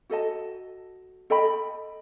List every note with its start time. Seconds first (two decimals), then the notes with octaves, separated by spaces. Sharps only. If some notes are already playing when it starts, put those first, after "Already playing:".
0.10 F#4 A4 D#5 A5
1.30 A4 D#5 G5 B5